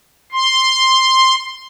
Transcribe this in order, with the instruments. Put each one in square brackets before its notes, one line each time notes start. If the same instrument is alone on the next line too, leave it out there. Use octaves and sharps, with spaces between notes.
[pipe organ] C6